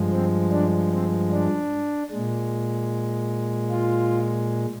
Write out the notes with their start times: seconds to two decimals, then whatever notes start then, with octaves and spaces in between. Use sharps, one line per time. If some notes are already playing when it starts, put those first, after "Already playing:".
Already playing: G2 F3 G#3
0.12 C4
0.52 D4
0.92 C4
1.32 D4
2.11 A#2 G#3
3.71 F4